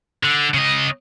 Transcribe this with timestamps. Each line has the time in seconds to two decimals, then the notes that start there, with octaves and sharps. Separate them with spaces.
0.23 D3
0.54 C#3 D#5